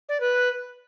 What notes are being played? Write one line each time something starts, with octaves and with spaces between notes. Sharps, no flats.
D5
B4